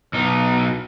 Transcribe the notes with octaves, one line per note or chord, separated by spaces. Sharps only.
B1 D#4